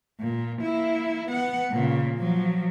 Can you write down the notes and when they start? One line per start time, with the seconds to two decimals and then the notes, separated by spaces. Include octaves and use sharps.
0.20 A#2
0.62 A#3 E4
1.29 B3 F#5
1.71 A#2 C#3
2.16 F3 F#3